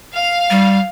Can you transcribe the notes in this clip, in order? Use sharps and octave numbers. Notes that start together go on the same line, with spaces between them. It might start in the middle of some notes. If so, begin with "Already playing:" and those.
F5
G3